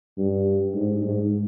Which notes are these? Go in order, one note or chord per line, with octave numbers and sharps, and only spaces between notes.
G2
G#2
G#2